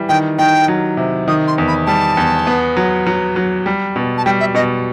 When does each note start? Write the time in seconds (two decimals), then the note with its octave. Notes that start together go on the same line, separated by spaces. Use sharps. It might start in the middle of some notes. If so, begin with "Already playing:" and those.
Already playing: E3 G3
0.09 D#3 G5
0.38 D#3 G5
0.68 F#3
0.97 C3
1.28 D#3 D#6
1.47 C6
1.58 E2
1.68 B5
1.87 G3 A5
2.17 E2
2.47 B3
2.77 F#3
3.07 F#3
3.36 F#3
3.66 G3
3.96 B2
4.18 A5
4.26 G3 G5
4.40 E5
4.54 B2 D#5